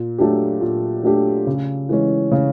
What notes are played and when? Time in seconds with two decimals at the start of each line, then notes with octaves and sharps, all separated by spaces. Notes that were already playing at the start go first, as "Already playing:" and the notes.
Already playing: A#2
0.18 F#3 A3 D4 G4
0.61 A#2
1.04 F#3 A3 D4 G4
1.47 C#3
1.89 E3 G#3 C#4
2.32 C#3